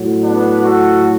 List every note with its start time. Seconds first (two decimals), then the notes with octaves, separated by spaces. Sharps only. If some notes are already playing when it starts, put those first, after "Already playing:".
Already playing: A2 F#3
0.22 B3 D4
0.63 F#4 A4